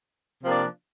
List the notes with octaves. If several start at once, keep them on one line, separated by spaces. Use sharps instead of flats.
C3 F3 A#3 D4